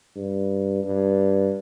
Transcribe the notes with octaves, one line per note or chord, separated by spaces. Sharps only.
G2
G2